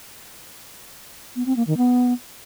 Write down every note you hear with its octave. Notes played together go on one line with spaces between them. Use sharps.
B3
C4
A#3
D#3
B3